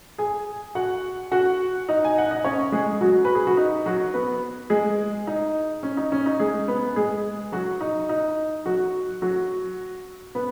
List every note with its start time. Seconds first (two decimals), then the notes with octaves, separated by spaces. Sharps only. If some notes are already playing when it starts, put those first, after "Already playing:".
0.18 G#4 G#5
0.75 F#4 F#5
1.32 F#4 F#5
1.89 D#4 D#5
2.05 G#5
2.18 F#5
2.31 D#5
2.44 C#4 C#5
2.72 G#3 G#4
3.01 F#3 F#4
3.25 B4
3.35 G#4
3.47 F#4
3.57 D#4
3.86 F#3 F#4
4.14 B3 B4
4.70 G#3 G#4
5.27 D#4
5.83 C#4
5.97 D#4
6.12 C#4
6.26 D#4
6.40 G#3 G#4
6.68 B3 B4
6.96 G#3 G#4
7.52 F#3 F#4
7.81 D#4
8.09 D#4
8.66 F#3 F#4
9.22 F#3 F#4
10.35 B3 B4